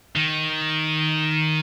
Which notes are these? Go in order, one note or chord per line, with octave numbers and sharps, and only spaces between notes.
D#3